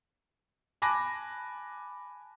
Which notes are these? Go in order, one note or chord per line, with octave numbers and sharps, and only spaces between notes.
G#5 A5 B5 D6 F#6 A#6